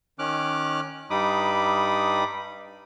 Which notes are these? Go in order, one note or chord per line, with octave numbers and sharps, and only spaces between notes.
D#3 C#4 D6 F6 F#6
G2 G3 D#4 B5 D6 D#6